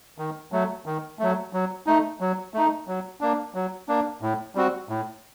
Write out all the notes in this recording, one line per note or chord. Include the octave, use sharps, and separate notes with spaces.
D#3
F#3 A3
D#3
F#3 A3
F#3
A3 D#4
F#3
A3 D#4
F#3
A#3 D4
F#3
A#3 D4
A2
G3 C4 F#4
A2